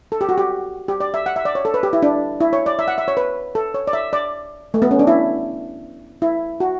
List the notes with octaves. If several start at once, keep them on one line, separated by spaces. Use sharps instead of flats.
A4
G4
F#4
G4
G4
D5
E5
F#5
E5
D5
C#5
A4
B4
G4
E4
D4
E4
C#5
D5
E5
F#5
E5
C#5
B4
A4
C#5
D5
E5
D5
A3
B3
C#4
D4
E4
E4
F#4